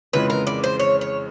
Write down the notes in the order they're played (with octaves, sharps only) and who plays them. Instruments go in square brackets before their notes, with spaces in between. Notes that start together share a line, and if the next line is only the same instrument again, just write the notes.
[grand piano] F2 C#3 E3 G#3 [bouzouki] B4
[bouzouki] A#4
D5
C5
C#5
C#5